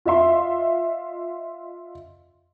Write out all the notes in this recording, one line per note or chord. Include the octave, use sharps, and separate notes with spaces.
F4 D#5 E5 C6